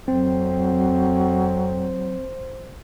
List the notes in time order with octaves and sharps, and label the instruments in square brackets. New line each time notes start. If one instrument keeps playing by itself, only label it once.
[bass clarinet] F2 [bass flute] F#3 [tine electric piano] C4 [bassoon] C5